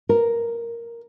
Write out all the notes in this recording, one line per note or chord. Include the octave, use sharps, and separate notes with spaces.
A#4